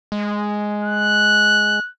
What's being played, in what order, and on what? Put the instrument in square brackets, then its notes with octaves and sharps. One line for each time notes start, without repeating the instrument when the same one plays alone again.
[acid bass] G#3
[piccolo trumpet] F#6